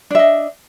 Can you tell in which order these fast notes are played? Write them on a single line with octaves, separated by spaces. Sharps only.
D4 E5 D#5